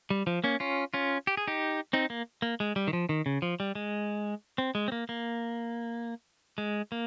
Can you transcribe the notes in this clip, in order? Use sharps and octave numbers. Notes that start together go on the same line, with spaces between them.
G3
F3
A#3 C#4
C#4 F4
C#4 F4
G4
G#4
D#4 G4
C4 D#4
A#3
A#3
G#3
G3
D#3
F3
D#3
C#3
F3
G3
G#3
C4
G#3
C4
A#3
A#3
G#3
A#3